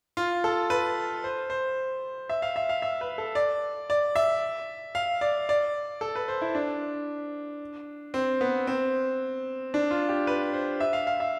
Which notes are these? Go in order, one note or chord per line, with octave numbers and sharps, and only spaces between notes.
F4
A4
B4
C5
C5
E5
F5
E5
F5
E5
B4
A4
D5
D5
E5
F5
D5
D5
A4
B4
C5
E4
D4
C4
B3
C4
D4
F4
G4
B4
C5
E5
F5
F5
E5